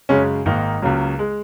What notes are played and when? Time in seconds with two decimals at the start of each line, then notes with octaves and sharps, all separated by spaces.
0.09 F#2 C#3 G#3 C#4
0.45 G#1 G#2 D#3 A#3 D#4
0.82 C#2 C#3 F#3 A#3
1.19 G#3